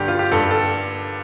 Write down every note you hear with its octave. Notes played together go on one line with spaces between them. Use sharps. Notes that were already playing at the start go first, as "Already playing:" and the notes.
Already playing: G2 D3 G4
F4
G4
G2 A4
A4